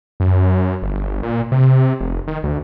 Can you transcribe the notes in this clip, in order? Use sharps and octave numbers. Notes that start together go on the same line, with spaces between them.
F#2
G1
A#2
C3
F1
D#3
D2